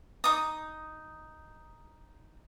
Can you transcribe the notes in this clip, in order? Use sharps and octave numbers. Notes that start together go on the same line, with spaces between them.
D#4 D#6